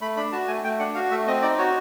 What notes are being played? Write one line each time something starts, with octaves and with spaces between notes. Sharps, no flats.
A3 B5
D4 B5
F#4 A5
A3 G#5
A3 G5
D4 F#5
F#4 F5
A3 E5
C4 D#5
D#4 D5
F#4 C#5